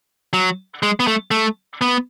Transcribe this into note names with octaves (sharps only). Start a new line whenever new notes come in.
F#3
G#3
B3
A3
A3
B3